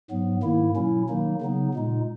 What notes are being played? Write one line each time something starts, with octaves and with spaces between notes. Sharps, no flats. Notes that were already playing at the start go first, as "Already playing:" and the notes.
G#2 F#3 B3
G#2 D#3 A#3 E4
B2 F#3 C#4 E4
D#3 F#3 A#3 D#4
C#3 F#3 B3 D#4
A#2 G#3 D#4